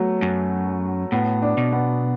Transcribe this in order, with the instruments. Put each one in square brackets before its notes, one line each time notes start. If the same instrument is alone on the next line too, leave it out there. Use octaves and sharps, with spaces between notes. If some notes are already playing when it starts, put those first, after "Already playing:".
Already playing: [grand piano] F#3 A3 B3
[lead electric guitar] F#2
[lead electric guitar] A2 [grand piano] B3
[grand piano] D4
[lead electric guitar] B2
[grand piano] B3